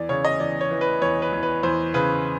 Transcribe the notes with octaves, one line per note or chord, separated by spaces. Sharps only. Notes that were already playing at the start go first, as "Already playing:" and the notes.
Already playing: E2 D5
C#3 C#5
D#5
E2 D5
C#5
E3
B4
E2 C#5
B4
E2
B4
E2 C5
C#3 B4